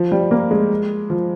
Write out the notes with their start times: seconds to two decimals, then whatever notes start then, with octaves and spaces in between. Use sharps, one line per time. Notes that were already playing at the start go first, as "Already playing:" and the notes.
Already playing: F3
0.12 G3
0.31 A#3
0.51 G#3
1.10 F3